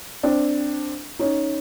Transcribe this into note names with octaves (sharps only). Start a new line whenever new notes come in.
C4 D4
C#4 D#4